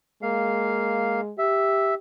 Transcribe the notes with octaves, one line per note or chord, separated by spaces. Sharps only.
G#3 A#3 F5
G4 E5